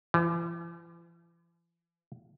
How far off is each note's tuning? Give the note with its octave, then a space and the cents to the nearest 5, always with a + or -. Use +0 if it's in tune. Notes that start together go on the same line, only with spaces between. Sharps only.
E3 +45